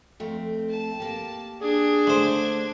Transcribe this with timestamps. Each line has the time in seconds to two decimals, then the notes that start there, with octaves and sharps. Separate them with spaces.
0.20 F2 A3 C4
0.70 A5
1.00 A#3 G4
1.62 D4 G#4 G#6
2.07 D3 A3 C5 E5